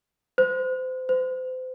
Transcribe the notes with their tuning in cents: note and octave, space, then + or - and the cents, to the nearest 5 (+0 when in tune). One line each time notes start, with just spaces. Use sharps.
C5 -30
C5 -35